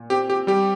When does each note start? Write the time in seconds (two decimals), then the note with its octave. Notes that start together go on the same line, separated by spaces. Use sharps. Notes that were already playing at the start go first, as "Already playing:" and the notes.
Already playing: A#2
0.10 C4 G4
0.30 G4
0.47 G3 G4